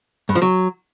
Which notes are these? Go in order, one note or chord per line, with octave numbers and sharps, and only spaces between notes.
G2
F3
F#3